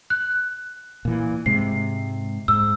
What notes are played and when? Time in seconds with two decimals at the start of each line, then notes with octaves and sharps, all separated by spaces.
0.10 F#6
1.05 A#2 E3
1.46 G#2 C3 G#3 C7
2.48 G#2 E6